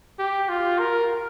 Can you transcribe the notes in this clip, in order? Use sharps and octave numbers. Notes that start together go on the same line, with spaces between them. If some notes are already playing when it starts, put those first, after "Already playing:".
G4
F4
A#4